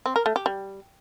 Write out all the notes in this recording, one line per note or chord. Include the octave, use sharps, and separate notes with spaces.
C4
A#4
A3
G4
G3